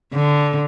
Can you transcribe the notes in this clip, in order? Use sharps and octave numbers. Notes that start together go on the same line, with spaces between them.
D3